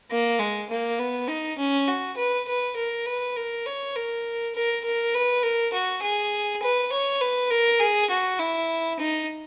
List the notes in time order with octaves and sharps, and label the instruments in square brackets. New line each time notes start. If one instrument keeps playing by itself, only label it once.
[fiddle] A#3
G#3
A#3
B3
D#4
C#4
F#4
B4
B4
A#4
B4
A#4
C#5
A#4
A#4
A#4
B4
A#4
F#4
G#4
B4
C#5
B4
A#4
G#4
F#4
E4
D#4